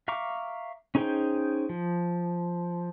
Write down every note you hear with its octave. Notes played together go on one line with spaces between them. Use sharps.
E5 F5 A#5 C#6 D6
C#4 D#4 G#4 C5 G5
F3